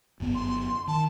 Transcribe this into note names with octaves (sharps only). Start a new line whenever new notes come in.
G1 F#2 B3
C6
D#3 A5